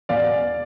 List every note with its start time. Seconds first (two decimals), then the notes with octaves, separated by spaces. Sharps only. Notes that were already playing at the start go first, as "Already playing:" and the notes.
0.09 E1 E2 B2 D5 F5